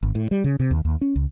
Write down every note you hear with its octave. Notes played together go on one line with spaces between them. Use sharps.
G#1
A2
G3
C#3
C3
D#2
D#2
C#4
C#2